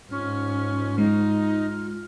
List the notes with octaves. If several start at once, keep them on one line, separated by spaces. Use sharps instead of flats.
G#2 C#4 F4 F6
G#3 D#4